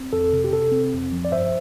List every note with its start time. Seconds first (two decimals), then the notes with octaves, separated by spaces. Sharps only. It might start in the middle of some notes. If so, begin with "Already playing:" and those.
Already playing: C4
0.13 F2 A4
0.33 C3
0.44 G4
0.52 C3 A4
0.72 C4
0.93 F2
1.12 F3
1.25 D5
1.32 G2 C5 E5